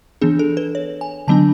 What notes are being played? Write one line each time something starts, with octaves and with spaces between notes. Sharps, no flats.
E3 B3 D4 G#4
A4
B4
C#5
G#5
D3 F#3 B3 D4 A5